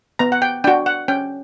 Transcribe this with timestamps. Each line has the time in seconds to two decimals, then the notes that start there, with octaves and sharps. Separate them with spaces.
0.19 B3 A#5
0.32 F#5
0.42 G5
0.64 D4 F#4 G5
0.86 F#5
1.08 C#4 G5